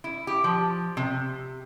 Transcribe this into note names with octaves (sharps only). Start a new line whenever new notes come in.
E4
G4
F3
C3